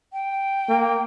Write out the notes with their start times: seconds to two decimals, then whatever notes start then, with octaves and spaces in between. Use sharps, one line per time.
0.13 G5
0.69 A#3